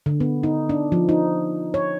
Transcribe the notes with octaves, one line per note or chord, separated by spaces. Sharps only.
D3
B3
D#4
D4
F3
D#4
C#5